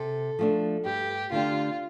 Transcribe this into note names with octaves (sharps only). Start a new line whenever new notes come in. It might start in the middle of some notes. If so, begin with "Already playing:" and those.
Already playing: C3 A4
F3 A3 D4
G2 G4
D3 A3 D4 F4 G4